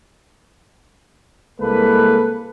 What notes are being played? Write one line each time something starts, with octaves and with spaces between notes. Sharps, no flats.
C2 G#3 A#3 A4 B4